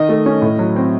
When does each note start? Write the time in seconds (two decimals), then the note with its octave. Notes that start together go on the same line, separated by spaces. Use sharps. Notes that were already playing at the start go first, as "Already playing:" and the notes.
Already playing: D#3 D#5
0.09 A3
0.26 C#4
0.42 A2
0.59 F#3
0.76 C4